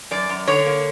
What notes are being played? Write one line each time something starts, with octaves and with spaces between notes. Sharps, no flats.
F#2 D5
F#2
D3 C#5
A#3